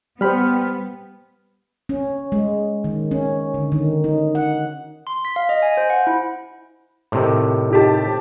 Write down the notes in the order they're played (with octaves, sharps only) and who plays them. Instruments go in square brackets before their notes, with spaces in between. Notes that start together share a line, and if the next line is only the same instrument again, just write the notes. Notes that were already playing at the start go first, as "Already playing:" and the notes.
[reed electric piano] G3 B5 [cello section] B3 [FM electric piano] C5 G5 F6
[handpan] C#4
G#3
D#3
C#4
D3
D#3
D#4
F#5
[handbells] C6
B6
F5
D#5
G#5
C5
F#5
E4
[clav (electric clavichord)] A2 C3 D#3
[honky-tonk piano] D#4 G4 A5